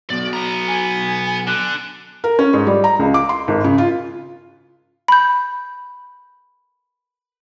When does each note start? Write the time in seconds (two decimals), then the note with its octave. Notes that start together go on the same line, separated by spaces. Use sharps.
0.10 B1 B2 D5
0.33 B3 A#5
0.68 G#5
1.47 D3 F#6
2.24 A#4
2.39 C#4
2.54 G#2
2.67 G3
2.84 A#5
2.99 C#2
3.14 D6
3.29 C6
3.48 G#1
3.64 C#3
3.78 F4
5.08 B5 G6